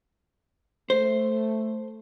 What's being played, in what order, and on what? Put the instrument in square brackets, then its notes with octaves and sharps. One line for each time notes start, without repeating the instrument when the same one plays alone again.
[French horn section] A3 [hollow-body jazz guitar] C5